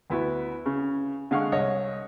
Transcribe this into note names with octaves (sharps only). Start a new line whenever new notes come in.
D2 B3 E4 F#4
C#3
D3 G#3 F5 F#5 C#6
C2 C#5 D#5